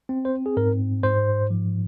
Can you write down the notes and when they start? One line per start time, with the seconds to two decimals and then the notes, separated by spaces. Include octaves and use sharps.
0.09 C4
0.25 C5
0.46 G#4
0.57 G#2 A#4
1.03 G#2 C5
1.50 F3